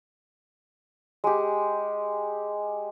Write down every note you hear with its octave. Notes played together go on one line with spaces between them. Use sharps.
G#3 G4